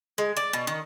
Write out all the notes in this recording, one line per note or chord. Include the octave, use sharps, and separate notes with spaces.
G#3
D5
B2
D#3